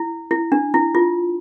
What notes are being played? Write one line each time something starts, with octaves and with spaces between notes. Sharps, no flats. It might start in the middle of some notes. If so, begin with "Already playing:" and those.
Already playing: E4
E4
D4
E4
F4